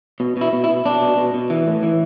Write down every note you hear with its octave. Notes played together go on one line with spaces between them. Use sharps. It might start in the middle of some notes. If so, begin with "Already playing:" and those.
B2
B2 E4
B2
E4
B2
B2 D4
B2
B2
B2
E3
A2
E3